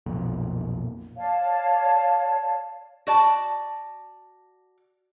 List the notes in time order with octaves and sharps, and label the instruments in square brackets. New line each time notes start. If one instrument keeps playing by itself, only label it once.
[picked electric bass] B1 F2 A#2
[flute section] C#5 D5 F5 A5
[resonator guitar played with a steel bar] F#4 D5 A5